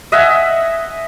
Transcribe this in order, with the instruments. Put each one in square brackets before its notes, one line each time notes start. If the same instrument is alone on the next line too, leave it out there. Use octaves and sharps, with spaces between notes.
[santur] D#5 E5 F#5 G#5